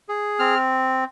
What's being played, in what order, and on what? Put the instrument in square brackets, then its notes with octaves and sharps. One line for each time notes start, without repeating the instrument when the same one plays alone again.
[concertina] G#4
C4 F6